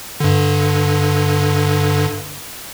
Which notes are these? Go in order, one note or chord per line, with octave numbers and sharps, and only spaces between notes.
G2 D3